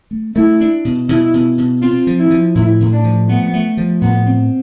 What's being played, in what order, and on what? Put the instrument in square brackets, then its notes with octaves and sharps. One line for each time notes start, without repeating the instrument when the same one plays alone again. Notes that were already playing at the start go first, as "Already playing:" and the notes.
[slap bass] A3
[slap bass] A3 [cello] E4
[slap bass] D4
B2
[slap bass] B2 [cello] E4
[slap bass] B2
B2
[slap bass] C4 [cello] F4
[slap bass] F3
[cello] E4
[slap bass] F3
[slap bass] A2 [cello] E4
[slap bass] A2
[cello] D4
[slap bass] F3
[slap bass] A3 [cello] B3
[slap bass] A3
F3
[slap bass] A2 [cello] B3
[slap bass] C4